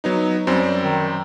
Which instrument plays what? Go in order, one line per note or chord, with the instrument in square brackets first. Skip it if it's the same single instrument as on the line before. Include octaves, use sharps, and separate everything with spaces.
[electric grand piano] F#3 B3 D#4
[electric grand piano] F#2 C4 [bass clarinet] G3
[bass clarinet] D#3